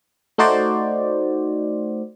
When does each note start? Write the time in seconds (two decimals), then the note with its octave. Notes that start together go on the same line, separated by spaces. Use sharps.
0.38 A3 D#4 F#4 C5 D5